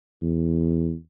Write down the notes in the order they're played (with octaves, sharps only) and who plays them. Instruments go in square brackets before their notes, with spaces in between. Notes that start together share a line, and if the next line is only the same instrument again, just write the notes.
[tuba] E2